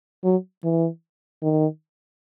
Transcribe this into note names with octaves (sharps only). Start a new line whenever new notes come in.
F#3
E3
D#3